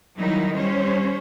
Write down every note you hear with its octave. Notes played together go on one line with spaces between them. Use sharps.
D#3 F#3 G3 D#4 E4
G3 C#4 C5 C#5